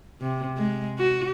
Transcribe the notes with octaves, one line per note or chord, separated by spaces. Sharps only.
C3
G#3
F#4